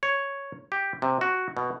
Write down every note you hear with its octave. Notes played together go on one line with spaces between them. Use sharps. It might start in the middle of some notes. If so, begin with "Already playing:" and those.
C#5
G4
C3
F#4
B2